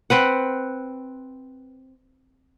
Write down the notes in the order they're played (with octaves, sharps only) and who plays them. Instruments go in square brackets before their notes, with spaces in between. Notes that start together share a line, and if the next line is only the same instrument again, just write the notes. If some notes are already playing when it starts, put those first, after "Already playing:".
[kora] C4 B4 F#5